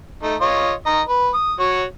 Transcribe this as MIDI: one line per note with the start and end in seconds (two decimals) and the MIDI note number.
0.23 0.35 57
0.23 0.35 63
0.41 0.71 65
0.41 0.71 73
0.41 0.71 75
0.86 1.01 51
0.86 1.01 75
0.86 1.01 82
1.09 1.30 71
1.34 1.53 87
1.60 1.83 66
1.60 1.83 73